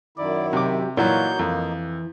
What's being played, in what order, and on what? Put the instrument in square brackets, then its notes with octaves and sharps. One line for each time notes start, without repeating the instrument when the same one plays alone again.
[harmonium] F#2 D#3 E4 [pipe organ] D5
[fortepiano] C3 D6 [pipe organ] F#3 G4
[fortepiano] A#2 E3 F#3 [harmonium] A#3 D#4 [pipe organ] F#4 C#5 G6
[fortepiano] F2 [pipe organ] E3